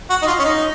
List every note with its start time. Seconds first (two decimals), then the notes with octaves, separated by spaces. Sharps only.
0.10 F#4
0.22 D#4
0.27 F4
0.39 C#4
0.44 D#4